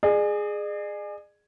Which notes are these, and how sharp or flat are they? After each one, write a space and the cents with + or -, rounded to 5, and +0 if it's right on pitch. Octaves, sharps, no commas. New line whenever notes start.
G#4 +0 D5 +45